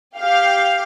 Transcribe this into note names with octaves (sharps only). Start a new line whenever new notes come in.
G4 F5